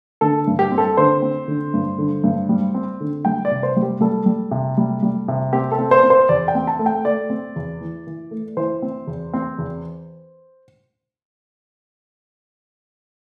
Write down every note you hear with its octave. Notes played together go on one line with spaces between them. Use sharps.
D3 A4
G2
G4
C4
A4
D3 C5
C4
D3
G2
D3
G2
G3
C4
D3
G3 G5
D5
C3
C5
G3
G4
G3 A4
G3
C3
G3
G3
C3
C4 G4
A4
C4
C5
C4
C5
E2 D5
G5
C4
A5
A3
G5
A3 D5
C4
E2
E3
E3
A3
E3 C5
C4
E2
C4
E2